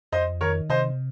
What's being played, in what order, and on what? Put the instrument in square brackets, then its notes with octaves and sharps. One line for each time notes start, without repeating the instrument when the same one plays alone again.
[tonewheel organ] F2 [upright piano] C5 D#5
[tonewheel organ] D#3 [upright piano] A#4 C#5
[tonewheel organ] C3 [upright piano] C5 D#5